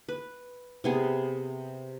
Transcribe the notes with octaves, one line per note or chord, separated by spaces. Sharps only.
B4
C3 B3 G#4